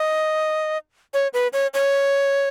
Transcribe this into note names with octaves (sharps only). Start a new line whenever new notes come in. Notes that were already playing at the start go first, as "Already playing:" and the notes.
Already playing: D#5
C#5
B4
C#5
C#5